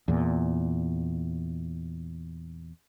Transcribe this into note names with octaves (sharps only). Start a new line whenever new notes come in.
E2 A#2